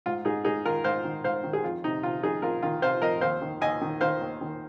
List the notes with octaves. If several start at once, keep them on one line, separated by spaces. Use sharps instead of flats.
G#2 F4
G#2 D#4 G#4
G#2 D#4 G#4
D#3 F4 A#4
G#2 C5 F5
D#3
G#2 C5 F5
D#3
G#4
F2 F4
C3 D#4
C3 F4
F2 D#4 G#4
F2 F4 A#4
D#3 F4 A#4
C3 C5 F5
F2 A#4 D#5
D#2 C5 F5
D#3
D#2 D#5 G#5
D#3
D#3 C5 F5
D#2
D#3